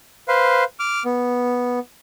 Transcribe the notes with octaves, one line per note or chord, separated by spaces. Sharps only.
B4 C5 F5
D6 F6
B3